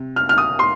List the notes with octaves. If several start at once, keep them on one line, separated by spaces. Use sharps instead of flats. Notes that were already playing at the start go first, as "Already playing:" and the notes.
Already playing: C3
F6
F6
D#6
C6